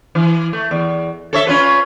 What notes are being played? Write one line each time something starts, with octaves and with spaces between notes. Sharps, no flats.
E3
A3
E2
A4 C#5 E5
C#4 F4 B4